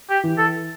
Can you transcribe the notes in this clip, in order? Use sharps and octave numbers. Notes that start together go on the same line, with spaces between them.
G4
E3
A4